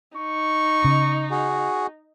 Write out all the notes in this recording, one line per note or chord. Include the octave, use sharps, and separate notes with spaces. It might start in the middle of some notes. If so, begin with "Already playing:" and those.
D#4 C#6
C#3
F#4 G#4